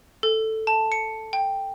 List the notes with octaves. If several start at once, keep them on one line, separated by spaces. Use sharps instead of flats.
A4
A5
C#7
G5